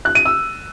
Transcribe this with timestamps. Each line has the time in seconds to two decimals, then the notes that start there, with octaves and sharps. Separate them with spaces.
0.05 F#6
0.15 D#7
0.25 E6